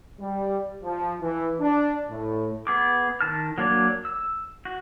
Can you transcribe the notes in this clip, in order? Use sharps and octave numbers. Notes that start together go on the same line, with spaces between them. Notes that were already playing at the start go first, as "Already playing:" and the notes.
G3
F3
E3
D4
A2
B3 G#4 D6
D#3 A5 F6
F#3 A#3 D4 C#5 D5
E6
F#4